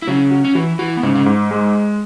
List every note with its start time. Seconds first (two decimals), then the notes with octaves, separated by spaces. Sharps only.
0.02 E4
0.07 C#3 F#3 C#4
0.31 F#4
0.45 C#4
0.55 E3 E4 F#4
0.79 E3 E4 F#4
0.97 B3
1.03 G#2 C#3 C#4
1.15 C#3 C#4
1.26 G#2
1.51 G#3